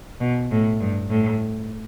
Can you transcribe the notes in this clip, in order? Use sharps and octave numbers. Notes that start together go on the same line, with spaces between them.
B2
A2
G2
A2